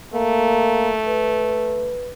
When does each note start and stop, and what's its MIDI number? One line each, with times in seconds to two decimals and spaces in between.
0.13 2.00 57
0.13 0.93 58
1.07 2.13 71